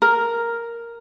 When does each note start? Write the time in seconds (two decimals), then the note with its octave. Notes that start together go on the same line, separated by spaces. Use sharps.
0.02 A#4